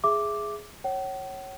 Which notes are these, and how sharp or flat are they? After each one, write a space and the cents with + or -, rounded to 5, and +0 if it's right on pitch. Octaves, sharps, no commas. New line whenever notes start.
G#4 +5 E5 +10 D6 +0
C#5 -15 F#5 +45